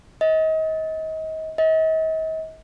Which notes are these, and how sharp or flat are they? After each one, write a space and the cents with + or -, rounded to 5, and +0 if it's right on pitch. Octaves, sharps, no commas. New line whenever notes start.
D#5 +35
D#5 +45